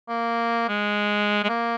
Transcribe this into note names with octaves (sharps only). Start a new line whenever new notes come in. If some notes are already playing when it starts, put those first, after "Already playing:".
A#3
G#3
G#3
A#3